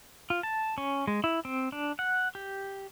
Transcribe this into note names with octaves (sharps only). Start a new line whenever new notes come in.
F4
A5
C#4
G#3
E4
C4
D4
F#5
G4